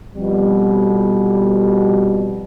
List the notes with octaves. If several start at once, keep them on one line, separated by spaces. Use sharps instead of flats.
F2 B2 G3